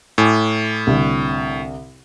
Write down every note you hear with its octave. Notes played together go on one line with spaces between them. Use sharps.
A2 G#5 D6
C2 D3